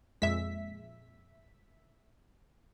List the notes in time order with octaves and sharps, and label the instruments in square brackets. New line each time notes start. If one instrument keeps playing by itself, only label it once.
[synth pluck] F2 A#2 G#3 [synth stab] E5 B6